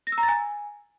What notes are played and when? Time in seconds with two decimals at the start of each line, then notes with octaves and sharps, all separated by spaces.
0.07 A#6
0.12 E6
0.18 A#5
0.23 A6
0.28 G#5